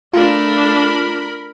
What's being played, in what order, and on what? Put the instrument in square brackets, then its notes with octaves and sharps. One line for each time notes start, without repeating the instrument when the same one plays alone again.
[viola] A3 D4 [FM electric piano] F4 [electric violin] A#4 B5